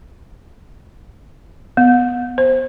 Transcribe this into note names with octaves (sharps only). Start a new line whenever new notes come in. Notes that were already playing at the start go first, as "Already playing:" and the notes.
B3
C5